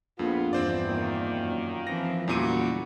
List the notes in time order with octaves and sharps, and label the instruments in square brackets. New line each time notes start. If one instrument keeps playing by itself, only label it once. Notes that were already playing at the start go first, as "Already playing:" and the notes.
[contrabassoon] A#1 [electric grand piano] F2 [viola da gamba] B3 [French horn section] F4
[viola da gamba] E2 G2 [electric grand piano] C4 C5 D5
[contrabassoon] A#2 [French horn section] D#3 A#3
[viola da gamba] F#2
[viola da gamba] E3 F3 C4 [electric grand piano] A#6
[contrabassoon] F#1 [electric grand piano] E2 A#2 D#7 [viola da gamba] G3 F#4